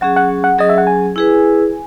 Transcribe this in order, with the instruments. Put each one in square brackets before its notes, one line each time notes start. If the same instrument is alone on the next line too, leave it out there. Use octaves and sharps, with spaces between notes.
[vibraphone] F#3 C#4 G#4 [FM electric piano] F#5
[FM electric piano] F#5
F#5
[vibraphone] F#3 C#4 G#4 [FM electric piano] D#5
[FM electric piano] E5
F#5
G#5
[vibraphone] E4 G#4 B4